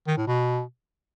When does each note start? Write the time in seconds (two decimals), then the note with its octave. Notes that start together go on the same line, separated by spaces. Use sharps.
0.07 D#3
0.17 A2
0.27 B2